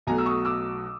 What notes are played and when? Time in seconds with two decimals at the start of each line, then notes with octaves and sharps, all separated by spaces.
0.07 B1 B2 F#3 A3 G#5 A#5
0.18 E6
0.26 C#6 D#6
0.45 D6 E6